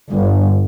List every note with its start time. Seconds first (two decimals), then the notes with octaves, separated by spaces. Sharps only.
0.11 G1